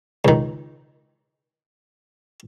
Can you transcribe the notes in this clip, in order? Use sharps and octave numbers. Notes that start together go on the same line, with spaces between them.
C#2 D#3